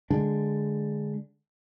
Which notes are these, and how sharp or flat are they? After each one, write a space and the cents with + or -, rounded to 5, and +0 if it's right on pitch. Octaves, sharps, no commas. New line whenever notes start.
D3 +0 G#3 +0 D4 +0